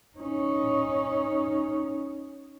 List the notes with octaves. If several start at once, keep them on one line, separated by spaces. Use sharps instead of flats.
C#4 D#4